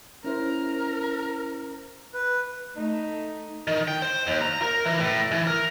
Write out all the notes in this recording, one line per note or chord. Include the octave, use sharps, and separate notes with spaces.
C#4 E4 A#4 C5
B4
A3 D#4
D#3
G5
C5
D#2
A#5
A#4
E3
A2
E3
A#4